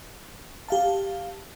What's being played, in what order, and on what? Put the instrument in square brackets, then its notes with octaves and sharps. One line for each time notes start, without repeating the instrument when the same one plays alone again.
[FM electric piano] G4 F5 A5